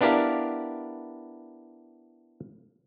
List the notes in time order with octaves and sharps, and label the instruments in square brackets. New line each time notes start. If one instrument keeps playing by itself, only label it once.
[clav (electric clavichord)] B3 D4 E4 G4 A#4 F5